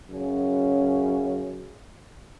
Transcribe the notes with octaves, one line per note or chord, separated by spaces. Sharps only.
F#2 C#3 C#4